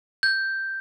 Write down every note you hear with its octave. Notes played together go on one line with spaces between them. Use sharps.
G6